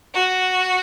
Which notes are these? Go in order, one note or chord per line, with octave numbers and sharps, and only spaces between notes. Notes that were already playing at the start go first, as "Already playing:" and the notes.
F#4